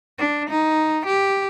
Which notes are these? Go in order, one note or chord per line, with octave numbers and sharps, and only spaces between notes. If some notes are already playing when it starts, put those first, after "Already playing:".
D4
D#4
G4